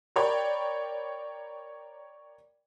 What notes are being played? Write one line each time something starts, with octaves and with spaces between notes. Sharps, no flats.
A#4 C#5 D5 G5 B5